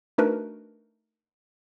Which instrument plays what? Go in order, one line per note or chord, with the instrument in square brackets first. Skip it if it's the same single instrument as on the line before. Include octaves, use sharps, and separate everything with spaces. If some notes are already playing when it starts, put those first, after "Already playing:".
[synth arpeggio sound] A3 D4 D#4 F#4 A#4 B4